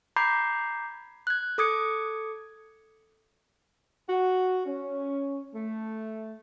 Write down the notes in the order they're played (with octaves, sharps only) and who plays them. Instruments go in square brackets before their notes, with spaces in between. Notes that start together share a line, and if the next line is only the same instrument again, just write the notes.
[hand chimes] A#5 B5 D6 G6 G#6 C7
F#6 G#6
A4 D6 D#6 G#6 C#7
[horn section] F#4
C#4
A3